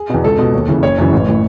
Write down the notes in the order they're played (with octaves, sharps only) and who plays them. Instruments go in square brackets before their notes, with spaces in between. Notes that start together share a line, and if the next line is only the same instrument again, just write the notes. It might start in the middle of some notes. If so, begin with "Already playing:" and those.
Already playing: [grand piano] G#4
E2 B2
C#2 A4
B2
D#2
C#3 E3
F#1 C#5
F#2 C#3 E3
A1
A2 E3